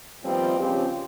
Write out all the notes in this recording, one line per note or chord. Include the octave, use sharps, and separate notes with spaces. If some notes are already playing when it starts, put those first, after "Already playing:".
A#2 D#3 F3 G3 B3 C4
C#3 F3 C4 C#4 G4